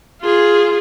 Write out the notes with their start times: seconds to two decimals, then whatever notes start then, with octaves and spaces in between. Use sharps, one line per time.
0.22 F4 G#4